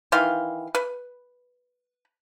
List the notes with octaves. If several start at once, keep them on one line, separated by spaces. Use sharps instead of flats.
D#3 E3 F5 C6
B4